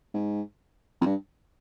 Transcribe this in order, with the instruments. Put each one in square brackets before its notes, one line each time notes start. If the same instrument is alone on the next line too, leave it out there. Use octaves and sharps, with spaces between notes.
[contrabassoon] G#2
F2
G2